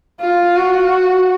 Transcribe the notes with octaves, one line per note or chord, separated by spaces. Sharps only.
F4
F#4